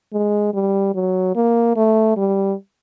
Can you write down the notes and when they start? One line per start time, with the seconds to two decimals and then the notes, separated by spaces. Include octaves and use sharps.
0.13 G#3
0.54 G3
0.95 F#3
1.35 A#3
1.76 A3
2.17 G3